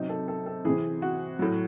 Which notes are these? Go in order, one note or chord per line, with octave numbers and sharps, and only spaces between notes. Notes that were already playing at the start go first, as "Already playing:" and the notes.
Already playing: C3 F#3 D#4
A4
A4
A4
C3 E3 G#4
F#4
A2 F#3